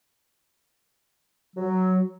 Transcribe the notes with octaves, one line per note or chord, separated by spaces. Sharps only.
F#3